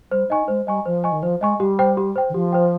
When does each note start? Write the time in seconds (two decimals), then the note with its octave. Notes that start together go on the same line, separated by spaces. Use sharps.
0.11 G3 C5
0.30 D#4 D#5 G#5 C#6
0.48 G#3 C5
0.67 G3 D#5 G#5 C#6
0.85 F3 C5
1.04 D#5 G#5 C#6
1.12 D#3
1.23 F3 C5
1.41 G#3 D#5 G#5 C#6
1.60 G3 G4
1.79 C5 G5
1.97 G4
2.16 C5 G5
2.29 D#3
2.34 F3 G4
2.52 C5 G5